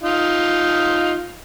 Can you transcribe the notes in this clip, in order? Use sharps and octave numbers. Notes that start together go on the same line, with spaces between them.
D#4 F4